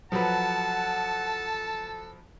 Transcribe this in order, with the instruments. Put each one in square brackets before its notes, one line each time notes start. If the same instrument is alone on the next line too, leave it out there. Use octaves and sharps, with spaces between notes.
[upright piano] F3 F#3 B4 [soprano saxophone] A4 [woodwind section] F#5 [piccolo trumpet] A5